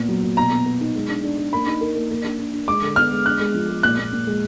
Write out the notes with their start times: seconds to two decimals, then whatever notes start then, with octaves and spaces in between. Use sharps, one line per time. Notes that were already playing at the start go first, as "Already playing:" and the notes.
Already playing: A#2 B3
0.09 F#3
0.23 A#2
0.37 B2 A#5
0.51 B3
0.66 B3
0.81 D#4
0.95 G#3
1.09 D4
1.24 D4
1.38 D4
1.53 A#3 B5
1.67 D#4
1.81 A#4
1.95 A#3
2.11 A#3
2.24 D4
2.38 D4
2.53 D4
2.68 G#3 D6
2.82 D3
2.96 B3 F6
3.11 G#3
3.26 D4 F#6
3.40 G#3
3.54 F3
3.69 G#3
3.83 A#2 F#6
3.98 A#2
4.13 A#2
4.27 G#3